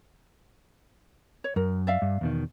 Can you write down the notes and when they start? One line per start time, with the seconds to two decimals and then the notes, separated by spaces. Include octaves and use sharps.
1.44 C#5
1.56 F#2 A#4
1.87 D5 E5 F5
2.02 G2
2.21 E2 B2 D#3